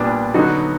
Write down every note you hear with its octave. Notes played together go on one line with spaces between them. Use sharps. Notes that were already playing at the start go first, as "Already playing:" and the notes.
Already playing: A#2 G3 B3 D4
D3 F#3 B3 D#4 F#4